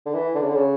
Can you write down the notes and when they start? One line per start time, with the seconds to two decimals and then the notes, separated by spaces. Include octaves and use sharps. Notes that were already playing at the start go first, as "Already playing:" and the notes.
0.06 D3
0.14 E3
0.35 D3
0.42 C#3
0.49 D3
0.57 C#3